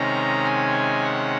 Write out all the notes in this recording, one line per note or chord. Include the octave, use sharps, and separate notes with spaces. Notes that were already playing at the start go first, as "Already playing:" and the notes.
Already playing: C3 D#3 G#3 C#4 A#5
G#5
F#5